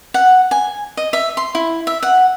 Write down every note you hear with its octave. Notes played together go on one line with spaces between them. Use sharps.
F#5
G#5
D#5
E5
C6
E4
E5
F#5